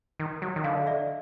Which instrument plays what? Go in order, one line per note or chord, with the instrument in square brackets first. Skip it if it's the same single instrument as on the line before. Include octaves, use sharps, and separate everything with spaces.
[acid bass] D#3
F#3
D#3
[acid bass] D3 [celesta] D#5 F5
[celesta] D5 E5